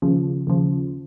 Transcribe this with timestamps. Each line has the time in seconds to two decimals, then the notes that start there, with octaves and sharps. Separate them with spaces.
0.02 D#2 C#3 F3
0.47 D#2 C#3 F3